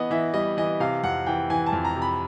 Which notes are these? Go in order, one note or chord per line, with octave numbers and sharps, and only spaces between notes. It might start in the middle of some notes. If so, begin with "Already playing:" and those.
Already playing: E3 B3 D#5
E3 E5
G3 D#5
E3 D#5
C3 F5
F2 F#5
E3 G5
E3 G#5
A5
F2
A#5
C3
B5